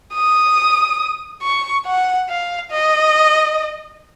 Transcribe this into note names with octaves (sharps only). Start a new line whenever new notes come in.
D#6
C#6
F#5
F5
D#5